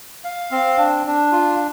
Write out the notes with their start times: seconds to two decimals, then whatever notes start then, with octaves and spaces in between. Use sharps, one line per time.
0.24 F5
0.51 C4
0.78 D4
1.06 D4
1.32 F4